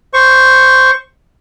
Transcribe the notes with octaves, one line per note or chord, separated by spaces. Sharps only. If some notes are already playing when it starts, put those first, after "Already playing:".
C5 C#6